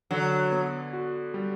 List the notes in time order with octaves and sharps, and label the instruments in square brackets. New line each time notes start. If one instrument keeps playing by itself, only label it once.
[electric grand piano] D3 [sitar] F#3
[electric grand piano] B3
F#4
G3